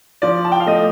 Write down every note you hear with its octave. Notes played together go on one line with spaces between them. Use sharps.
F3 D5
A5
G5
F5
A3 D#5